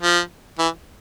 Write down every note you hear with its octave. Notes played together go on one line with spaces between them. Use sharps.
F3
E3